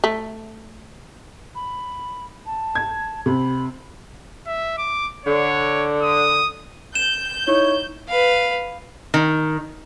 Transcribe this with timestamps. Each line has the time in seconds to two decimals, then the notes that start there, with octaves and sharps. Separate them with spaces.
0.04 A3
1.55 B5
2.46 A5
2.75 G#6
3.26 C3 B5
4.46 E5
4.78 D6
5.26 D3 C#5
6.02 D#6
6.95 G6 E7
7.47 D#4 E4 C#5
8.09 B4 F5
9.14 D#3